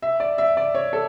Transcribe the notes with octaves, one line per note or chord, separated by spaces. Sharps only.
E5
D5
E5
D5
C#5
A4